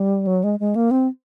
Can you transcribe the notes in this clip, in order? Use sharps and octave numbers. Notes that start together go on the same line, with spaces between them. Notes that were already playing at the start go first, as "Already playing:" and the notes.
Already playing: G3
F#3
G#3
G#3
A#3
C4